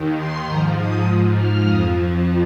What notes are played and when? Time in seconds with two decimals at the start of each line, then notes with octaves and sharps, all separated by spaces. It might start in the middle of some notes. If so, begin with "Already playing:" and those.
Already playing: D#2 D#3
0.16 C6
0.46 G#2 A#5
0.51 F3
0.77 D#6
1.06 G#2 F3
1.36 F6
1.66 F2 F3 D#6